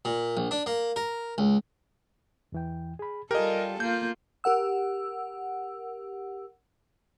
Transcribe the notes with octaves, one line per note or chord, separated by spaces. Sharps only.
A#2
A#1
D4
A#3
A#4
C#2
E2 E3 G5
G#4 B5
G3 F4 G4 A4 A#4 D#5 G#5
A#3 F4 G6
G4 A#4 F#5 E6